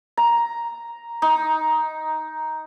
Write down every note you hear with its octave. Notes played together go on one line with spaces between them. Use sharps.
A#5
D#4